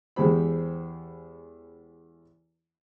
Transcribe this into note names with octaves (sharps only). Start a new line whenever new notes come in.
E2 G#3 G4 C5 B5